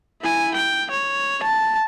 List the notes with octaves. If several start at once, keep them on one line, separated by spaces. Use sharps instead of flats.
E4 G#5
G5
C#5
A5